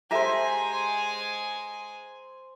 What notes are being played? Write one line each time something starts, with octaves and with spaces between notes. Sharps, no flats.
G#3 G4 A4 C5 E5 G#5 A#5